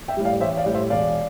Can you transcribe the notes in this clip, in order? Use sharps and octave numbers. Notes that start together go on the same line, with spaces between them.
E5 G5
A2 G3
D5 F5
A1 C5 E5
D5 F5
A2 G3
C5 E5
E1 D5 F5